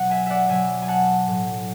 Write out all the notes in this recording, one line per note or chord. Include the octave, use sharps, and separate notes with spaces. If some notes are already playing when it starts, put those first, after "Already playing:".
Already playing: B2 F#3 F#5
E5 G#5
D5 E5 F#5
B2 F#3 E5 G#5
G#5
F#5 A5
A2 F#3